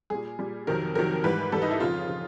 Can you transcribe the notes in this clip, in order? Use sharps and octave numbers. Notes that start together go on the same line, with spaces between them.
A#2 G3 G#4
A#2 G3
F2 C3 D#3 F#3 A#4
F2 C3 D#3 F#3 A#4
G#2 E3 G3 B4
G#2 E3 G3 A4
D#4
E4
F2 C#3 F3 F4
C#3 F3